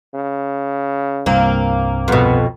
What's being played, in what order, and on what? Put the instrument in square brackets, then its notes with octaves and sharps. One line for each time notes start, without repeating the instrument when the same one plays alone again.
[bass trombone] C#3
[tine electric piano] C2 G2 C4 [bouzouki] A#3
[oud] F2 B2 [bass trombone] B3